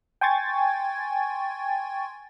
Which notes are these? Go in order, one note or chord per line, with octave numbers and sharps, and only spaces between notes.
G5 G#5 C6 C#6 G#6 A6